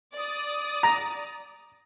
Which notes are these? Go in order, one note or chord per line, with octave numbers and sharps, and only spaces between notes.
D5 D#6
A#5